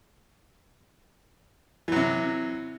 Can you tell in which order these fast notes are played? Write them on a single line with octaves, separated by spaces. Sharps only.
E3 F#3 C3